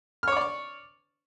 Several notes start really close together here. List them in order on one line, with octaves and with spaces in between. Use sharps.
F6 C#5 D6 D5 C#6